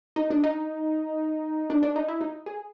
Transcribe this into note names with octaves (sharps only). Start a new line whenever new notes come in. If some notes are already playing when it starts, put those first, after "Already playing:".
D#4
D4
D#4
D4
D4
D#4
E4
D#4
G#4